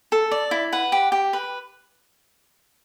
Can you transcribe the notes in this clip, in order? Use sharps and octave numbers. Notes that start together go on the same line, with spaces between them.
A4
D5
E4
B4 F#5
G4
G4
B4